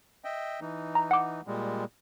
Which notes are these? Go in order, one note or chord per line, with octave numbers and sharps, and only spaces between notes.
D#5 E5 G5
E3 D#4
A#5
F#5 D6
A#2 G3 G#3